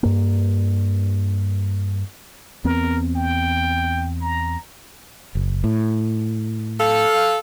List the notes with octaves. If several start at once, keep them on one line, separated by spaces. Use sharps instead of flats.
G2 A#3
E2 B3 C4 A#4
G5
A#5
F#1
A2
A4 F5